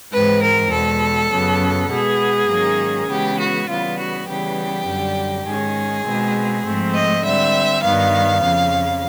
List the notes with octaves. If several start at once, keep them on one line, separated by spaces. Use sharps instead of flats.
G#2 E3 G#3 C4 B4
A#4
E2 B2 G#3 A4
F#2 C#3 F#3 B3
B2 G#3 B3 G#4
G#2 D#3 F#3 A#3 C#4
C#3 E3 G#3 B3 G4
F#4
C#3 E3 G3 B3 F4
F#4
C#3 E3 G3 B3 G4
F#2 D3 G3
G#2 D#3 G#3 C#4 G#4
B2 G#3 C4
G#2 F3 A3 C4
D#5
D3 G3 C4 E5
G2 D#3 G3 B3 F5
F2 C#3 F3